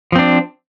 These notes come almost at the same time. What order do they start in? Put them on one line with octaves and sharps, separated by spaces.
F3 C4 D4